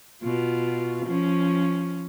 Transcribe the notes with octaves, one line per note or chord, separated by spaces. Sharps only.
B2 F4
F3 C#4